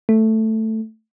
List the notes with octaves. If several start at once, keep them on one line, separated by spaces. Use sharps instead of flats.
A3